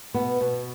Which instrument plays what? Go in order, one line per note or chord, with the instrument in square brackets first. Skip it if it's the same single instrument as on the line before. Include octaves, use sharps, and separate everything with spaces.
[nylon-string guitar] B2 B3
B2